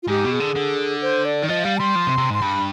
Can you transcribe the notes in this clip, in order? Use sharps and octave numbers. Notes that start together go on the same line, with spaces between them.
F4
G#2 G4
B2
G#4
D3
D3
C5
D5
D#3
F3 D#5
G3 F5
G3 C6
F3
C3
C3
G#2 C6
G2 B5